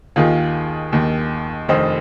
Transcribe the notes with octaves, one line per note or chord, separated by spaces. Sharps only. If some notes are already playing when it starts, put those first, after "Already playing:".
D#2 D#3 F4 G#4
D#2 D#3
F1 F2 D#3 C5 D#5